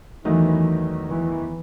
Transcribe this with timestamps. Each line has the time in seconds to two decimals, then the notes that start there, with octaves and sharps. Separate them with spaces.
0.25 E2 D#3 E3 F#3 A3 D#4
1.09 E3